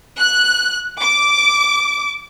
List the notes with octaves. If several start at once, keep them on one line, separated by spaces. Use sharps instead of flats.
F#6
D6